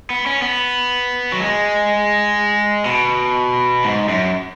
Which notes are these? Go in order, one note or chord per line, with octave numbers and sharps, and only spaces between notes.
B3
C#4
B3
F#3
G#3
B2
G#2
F#2